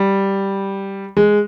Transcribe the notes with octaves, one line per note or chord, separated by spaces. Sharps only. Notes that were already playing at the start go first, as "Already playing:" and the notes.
Already playing: G3
G#3